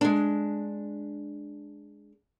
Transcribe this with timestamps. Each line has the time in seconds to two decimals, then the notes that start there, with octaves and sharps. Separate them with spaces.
0.01 G#3 D4